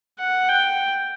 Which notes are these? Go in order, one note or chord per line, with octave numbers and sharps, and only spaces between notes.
F#5
G5